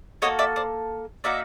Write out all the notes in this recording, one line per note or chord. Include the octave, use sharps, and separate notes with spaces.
A#3 D#4 F#4 A4 C#5 D#5
D5 E5
C5 D5
A#3 D#4 F#4 D5 E5